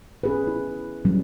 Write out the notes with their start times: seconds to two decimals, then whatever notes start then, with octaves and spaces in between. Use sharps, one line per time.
0.23 C#4 G#4 B4
0.47 E4
1.05 F#3 G3 C#4